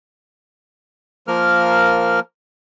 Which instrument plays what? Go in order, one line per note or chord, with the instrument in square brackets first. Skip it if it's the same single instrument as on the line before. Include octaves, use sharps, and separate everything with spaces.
[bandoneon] F3 A#3 A#4 F6